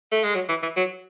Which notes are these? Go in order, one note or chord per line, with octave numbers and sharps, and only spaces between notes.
A3
G#3
F#3
E3
E3
F#3